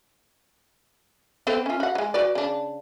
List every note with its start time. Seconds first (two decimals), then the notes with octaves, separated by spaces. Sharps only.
1.47 B3 C4 A4
1.66 C#4 F4
1.80 F#4 F#5
1.95 F#3 G#3
2.14 F#4 B4 D5
2.35 C#3 D4